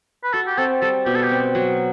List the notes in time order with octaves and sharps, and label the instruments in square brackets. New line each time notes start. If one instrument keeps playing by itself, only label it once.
[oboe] B4
[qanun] F#4 [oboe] A4
[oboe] G4
[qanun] C4 [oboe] A4
[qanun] G3 [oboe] A4
[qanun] B2 [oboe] G4
[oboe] A4
G4
[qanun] C4
F#3